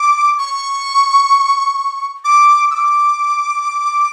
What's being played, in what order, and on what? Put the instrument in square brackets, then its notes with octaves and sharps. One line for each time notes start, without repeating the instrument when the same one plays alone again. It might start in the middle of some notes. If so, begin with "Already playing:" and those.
Already playing: [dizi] D6
C#6
D6
E6
D6